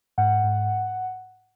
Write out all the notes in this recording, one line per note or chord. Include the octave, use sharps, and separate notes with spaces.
G#2 F#5
G#2